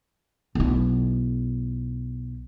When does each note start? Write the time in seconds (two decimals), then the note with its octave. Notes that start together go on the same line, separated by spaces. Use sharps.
0.55 B1 E4